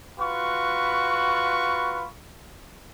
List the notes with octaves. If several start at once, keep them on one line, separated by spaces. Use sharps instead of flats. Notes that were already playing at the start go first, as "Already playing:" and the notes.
F4 F#4 B4 B5 C#6